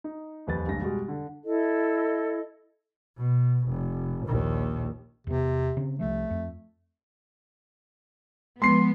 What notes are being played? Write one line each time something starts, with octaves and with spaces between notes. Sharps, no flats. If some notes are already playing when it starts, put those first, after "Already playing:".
D#4
D#1 F2 B4 A6
F1 C#2 G2 A#6
B2 G3 G#3
D3
E4 A4 D#5
B2
F1
A#1 D#2
E2 C3 B3
C#3 C4
C2 C3 F3 A3
F2
F3 G#3 B3 C6 C7